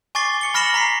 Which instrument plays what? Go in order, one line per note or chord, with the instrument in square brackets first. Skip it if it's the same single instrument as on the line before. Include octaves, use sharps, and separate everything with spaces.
[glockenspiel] G#5 C#6 D6 A6 C7 G7
C#6 C#7 G7
B5 F6 A#6 C#7 E7 F#7
A#5 B6 C7